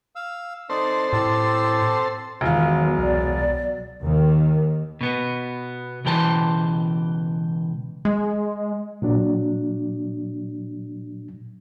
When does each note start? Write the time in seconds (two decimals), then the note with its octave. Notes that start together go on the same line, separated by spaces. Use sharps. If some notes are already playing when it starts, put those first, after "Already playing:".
0.16 F5 E6
0.70 C4 D#4 A4 C5 D5
1.13 A2 G4 A5 E6
2.41 E1 B2 D#3 F#3 F4
2.98 C2 D5
4.03 D#2 D#3
5.01 B2 B3
6.05 C#2 B2 E3 G4 C5 A5
8.05 G#3
9.02 A#2 F#3 D4